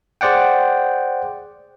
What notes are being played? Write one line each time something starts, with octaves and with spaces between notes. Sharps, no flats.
G#4 C5 D5 F#5 G5